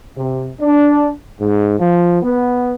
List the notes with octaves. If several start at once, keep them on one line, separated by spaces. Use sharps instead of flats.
C3
D4
G#2
F3
B3